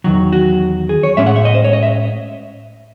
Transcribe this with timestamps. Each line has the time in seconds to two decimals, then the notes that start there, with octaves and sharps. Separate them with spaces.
0.04 E2 D#3 F#3 F#4
0.32 F#4
0.89 G#4
1.03 C#5
1.17 A2 G#3 C#4 E5
1.26 F#5
1.36 E5
1.45 D#5
1.55 C5
1.64 C#5
1.73 D#5
1.83 E5